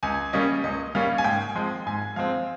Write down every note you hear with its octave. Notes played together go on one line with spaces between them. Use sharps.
C#2 G#5
C#3 G3 A#3 C#4 D#5
C#2 D#5
C#3 G3 A#3 C#4 F5
G#5
G#2 G5
F3 G#3 C4
G#2 G#5
F3 G#3 C4 F5